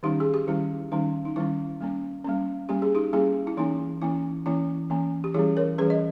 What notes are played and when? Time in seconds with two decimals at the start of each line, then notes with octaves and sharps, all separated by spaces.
0.03 D#3 G3 C#4 D#4 G4
0.20 G#4
0.34 G4
0.47 D#3 G3 C#4 E4
0.91 D#3 G3 C#4 D#4
1.25 D#4
1.36 D#3 G3 C#4 E4
1.80 G3 A#3 C#4
2.25 G3 A#3 C#4
2.69 G3 A#3 C#4 G4
2.82 G#4
2.95 D#4 G4
3.13 G3 A#3 C#4 E4 G#4
3.47 E4
3.57 E3 A#3 C#4 D#4
4.02 E3 A#3 C#4 E4
4.46 E3 A#3 C#4 E4
4.90 E3 A#3 C#4
5.24 G4
5.34 E3 G3 C#4 E4 G#4
5.57 A#4 C#5
5.78 E3 G3 C#4 G#4 B4
5.90 D#5